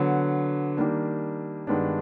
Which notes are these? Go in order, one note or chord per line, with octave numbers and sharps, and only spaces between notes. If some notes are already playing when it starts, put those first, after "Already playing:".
Already playing: D3 F#3 B3
D#3 G3 A#3 D4
G2 D#3 G#3 B3 D4